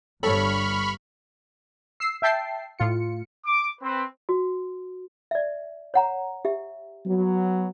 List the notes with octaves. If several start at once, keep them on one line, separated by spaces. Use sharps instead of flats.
G1 G2 A4 C#5 B5 C#6 F6
E6 C7
E5 G5 A5 C7
A2 F4 C#7
D6
C4 B4
F#4
D5 E5
C#5 F#5 A#5
G4 E5
F#3 B3